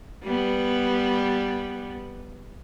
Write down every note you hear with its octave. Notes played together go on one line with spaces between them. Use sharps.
G3 B3